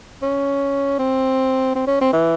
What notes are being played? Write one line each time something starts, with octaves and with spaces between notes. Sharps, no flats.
C#4
C4
C4
C#4
C4
E3